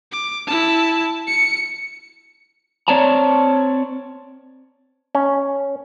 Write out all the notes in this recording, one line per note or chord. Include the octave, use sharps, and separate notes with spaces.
D6
E4 A5
C#7
C4 C#5 D5 A5 A#5
C#4